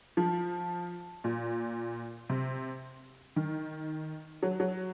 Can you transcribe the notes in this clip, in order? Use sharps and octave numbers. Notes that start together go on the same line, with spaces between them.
F3
A#2
C3
D#3
F#3
F#3